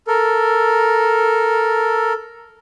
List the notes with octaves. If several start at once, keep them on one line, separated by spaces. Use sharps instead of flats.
A4 A#4